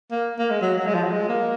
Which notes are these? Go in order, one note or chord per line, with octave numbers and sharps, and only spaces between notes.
A#3
A#3
G#3
F#3
F#3
G#3
F3
F#3
G#3
A#3